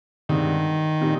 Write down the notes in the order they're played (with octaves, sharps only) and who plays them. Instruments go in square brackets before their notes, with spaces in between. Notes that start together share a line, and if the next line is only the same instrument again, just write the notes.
[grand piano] G2 D3 G#3 C4 [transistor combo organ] D#3
[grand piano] A#2 G3 C4 D#4